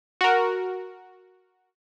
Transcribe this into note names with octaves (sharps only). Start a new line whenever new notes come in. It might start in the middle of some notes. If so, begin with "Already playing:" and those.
F#4 A#4